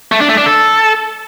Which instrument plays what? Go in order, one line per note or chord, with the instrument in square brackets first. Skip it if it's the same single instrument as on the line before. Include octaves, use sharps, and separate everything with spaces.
[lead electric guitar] A3
D4
A3
D4
A4